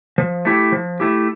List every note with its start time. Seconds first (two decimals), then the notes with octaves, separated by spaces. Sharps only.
0.18 F3
0.45 A3 E4 G4
0.72 F3
1.00 A3 E4 G4